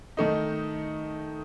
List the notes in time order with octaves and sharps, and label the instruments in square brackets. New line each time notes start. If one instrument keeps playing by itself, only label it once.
[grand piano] D#3 A3 D#4